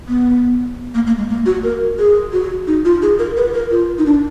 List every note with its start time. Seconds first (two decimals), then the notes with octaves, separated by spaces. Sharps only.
0.09 B3
0.95 A#3
1.07 A#3
1.18 G#3
1.29 A#3
1.46 F#4
1.64 A#4
1.99 G#4
2.33 F#4
2.67 D#4
2.85 F4
3.02 G#4
3.19 A#4
3.37 B4
3.54 A#4
3.71 F4
3.98 D#4
4.06 D4